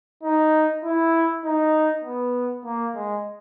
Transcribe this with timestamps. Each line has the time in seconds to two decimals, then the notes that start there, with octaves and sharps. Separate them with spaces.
0.23 D#4
0.84 E4
1.45 D#4
2.04 B3
2.65 A#3
2.95 G#3